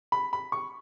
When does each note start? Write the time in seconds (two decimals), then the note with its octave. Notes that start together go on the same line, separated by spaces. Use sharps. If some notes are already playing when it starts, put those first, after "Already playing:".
0.12 B5
0.33 B5
0.52 C#6